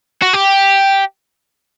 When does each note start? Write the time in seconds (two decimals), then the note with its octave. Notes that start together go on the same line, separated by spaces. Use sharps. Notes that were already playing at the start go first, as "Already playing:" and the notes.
0.22 F#4
0.33 G4